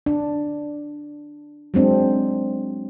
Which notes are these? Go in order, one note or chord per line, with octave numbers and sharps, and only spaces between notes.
D4
F#3 G#3 C4 D4